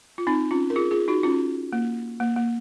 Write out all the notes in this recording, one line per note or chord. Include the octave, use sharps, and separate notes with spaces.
F4
C4 D#4
C#4 F4
A#4
F4 G#4
F4 G#4
D#4 F#4
C#4 F4
A#3
A#3
A#3